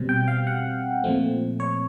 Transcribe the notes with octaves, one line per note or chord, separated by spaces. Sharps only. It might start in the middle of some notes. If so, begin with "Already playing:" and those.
Already playing: B2 G3 C4
G5
F5
F#5
A#2 F3 A3 C4
C#5